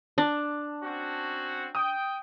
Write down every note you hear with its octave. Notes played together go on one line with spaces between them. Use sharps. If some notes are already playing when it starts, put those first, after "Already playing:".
D4 A5
C4 C#4 F#4
G5 D#6